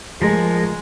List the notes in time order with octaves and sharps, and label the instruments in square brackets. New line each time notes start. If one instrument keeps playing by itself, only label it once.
[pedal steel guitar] F3 A#4 [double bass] G#3